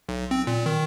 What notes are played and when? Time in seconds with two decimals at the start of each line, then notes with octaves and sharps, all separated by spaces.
0.09 B1
0.31 C4
0.47 A#2
0.66 D#3